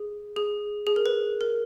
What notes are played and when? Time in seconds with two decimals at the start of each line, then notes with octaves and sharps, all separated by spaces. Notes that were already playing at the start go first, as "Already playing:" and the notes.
Already playing: G#4
0.36 G#4
0.87 G#4
0.96 A#4
1.06 B4
1.41 A#4